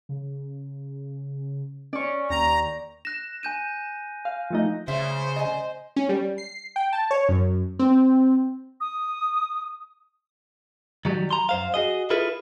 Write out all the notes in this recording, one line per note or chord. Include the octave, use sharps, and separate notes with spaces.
C#3
C#4 D5 C#6
D#2 G5 A#5
F#6 A#6 E7
G#5 G6 D#7
F5
F3 A3 D#4
C#3 C5 E5
D#5 G#5
C#4
G3
C7
G5
A5
C#5
F#2
C4
D#6
D#3 F#3 G3
A#5 C6
F#2 C5 F5
F#4 G#4 D#5
E4 F4 G#4 A4 B4